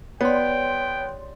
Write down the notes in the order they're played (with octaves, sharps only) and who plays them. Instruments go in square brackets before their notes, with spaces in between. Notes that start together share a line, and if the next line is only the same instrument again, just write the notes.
[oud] G3 [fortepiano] B3 [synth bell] C#5 C6 [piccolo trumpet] G5